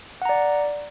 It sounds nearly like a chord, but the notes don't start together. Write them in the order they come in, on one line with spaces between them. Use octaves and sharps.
F#5 A#5 D5